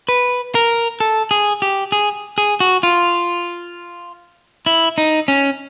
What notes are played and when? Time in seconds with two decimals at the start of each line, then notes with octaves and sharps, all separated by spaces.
0.09 B4
0.55 A#4
1.00 A4
1.31 G#4
1.62 G4
1.92 G#4
2.38 G#4
2.60 F#4
2.83 F4
4.66 E4
4.98 D#4
5.28 C#4